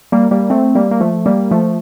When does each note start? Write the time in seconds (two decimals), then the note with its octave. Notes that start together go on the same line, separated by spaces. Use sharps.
0.12 G3 A#3
0.31 G3 A#3
0.50 A3 C4
0.75 G3 A#3
0.91 A#3
1.01 F3 A3
1.26 G3 A#3
1.51 F3 A3